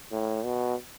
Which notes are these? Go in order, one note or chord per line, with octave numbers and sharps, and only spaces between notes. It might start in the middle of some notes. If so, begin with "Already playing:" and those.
A2
B2